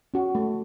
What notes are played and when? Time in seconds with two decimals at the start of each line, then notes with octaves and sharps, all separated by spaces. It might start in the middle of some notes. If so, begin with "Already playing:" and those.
0.14 C#4 F#4
0.35 A3